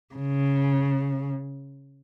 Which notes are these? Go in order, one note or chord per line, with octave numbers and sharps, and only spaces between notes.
C#3